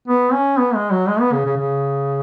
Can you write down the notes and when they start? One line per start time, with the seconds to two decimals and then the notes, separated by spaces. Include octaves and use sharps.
0.08 B3
0.33 C#4
0.58 B3
0.75 G#3
0.91 F#3
1.08 G#3
1.20 B3
1.33 C#3
1.45 C#3
1.57 C#3